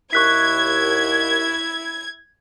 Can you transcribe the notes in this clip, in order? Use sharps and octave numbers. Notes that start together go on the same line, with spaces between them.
D#2 E4 C#6 F#6 G#6 B6